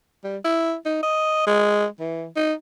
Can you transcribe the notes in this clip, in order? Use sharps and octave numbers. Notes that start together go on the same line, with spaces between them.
G3
E4
D#4
D#5
G#3
E3
D#4